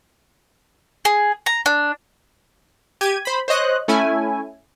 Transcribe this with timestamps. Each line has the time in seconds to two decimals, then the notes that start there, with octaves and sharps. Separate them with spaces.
1.05 G#4
1.46 A#5
1.66 D4
3.01 G4 G#6 D#7
3.25 C5 B5
3.48 C5 C#5 D#5 F#6
3.88 A3 C#4 E4 G#5